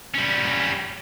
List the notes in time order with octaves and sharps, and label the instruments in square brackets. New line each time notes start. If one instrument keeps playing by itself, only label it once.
[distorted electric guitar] G3 C#4